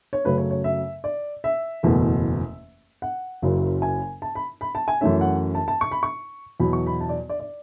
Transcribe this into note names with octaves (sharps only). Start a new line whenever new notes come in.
C#5
F#2 C#3 F#3 A3 C#4 B4
C#5
C#5
E5
D5
E5
F#1 E2 B2 A3
F#5
F#1 F#2 C#3 F#3 C#4
G#5
A5
B5
B5
A5
G#5
F#2 E3 A3 C#4 E5
F#5
A5
A5
C#6
B5
C#6
E2 B2 F#3 B5
C#6
B5
A5
D5
D5
D5